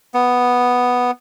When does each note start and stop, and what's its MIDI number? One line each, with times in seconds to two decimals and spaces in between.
0.14 1.11 59